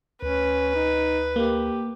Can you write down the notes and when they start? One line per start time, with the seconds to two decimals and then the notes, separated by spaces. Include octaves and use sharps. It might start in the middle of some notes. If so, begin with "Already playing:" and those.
0.23 D2 C#4 B4
0.75 D#4
1.36 A#3 G4